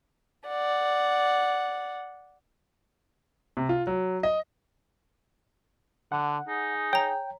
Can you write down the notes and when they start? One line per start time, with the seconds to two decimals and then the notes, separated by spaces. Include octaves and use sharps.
0.48 D5 F#5
3.57 C3
3.69 F4
3.87 F#3
4.23 D#5
6.12 D3 F#5
6.48 D#4 G#4
6.93 C#5 G5 A#5